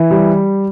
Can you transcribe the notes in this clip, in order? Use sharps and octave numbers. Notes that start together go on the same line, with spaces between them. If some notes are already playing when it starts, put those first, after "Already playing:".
Already playing: E3
G3